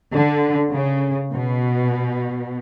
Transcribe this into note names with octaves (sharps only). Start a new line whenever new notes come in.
D3
C#3
B2